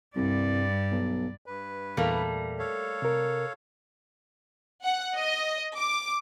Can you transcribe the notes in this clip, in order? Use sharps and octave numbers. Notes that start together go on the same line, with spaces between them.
C2 G2 D5
B1
G2 B4
E2 A#2 G3 A3 A#3
A4 C#5 F5
C3 A#4
F#5
D#5
D6